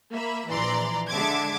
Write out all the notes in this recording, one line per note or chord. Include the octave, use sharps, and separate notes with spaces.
A#3 E5 B5
A#1 E3 D5 A#5 C6
D3 G#3 E5 A5 D6 G#6